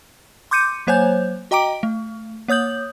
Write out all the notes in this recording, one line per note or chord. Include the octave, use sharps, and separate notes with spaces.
C6 D6 G6 C#7 D#7
F#3 A#3 C5 C#5 G#5 G6
F#4 D#5 G5 A#5 D6 D7
A3
A#3 C#5 D#6 G6 F#7